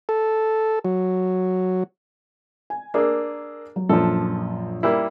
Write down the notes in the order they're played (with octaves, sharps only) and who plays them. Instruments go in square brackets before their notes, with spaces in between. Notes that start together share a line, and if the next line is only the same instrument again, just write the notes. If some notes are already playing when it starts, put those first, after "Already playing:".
[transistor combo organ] A4
F#3
[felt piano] G#5
[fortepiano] A#3 D4 G#4 [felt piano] A#4 E6
[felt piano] F#3
[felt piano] A#1 F#2 [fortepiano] F3 A4
[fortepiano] G3 A#3 E4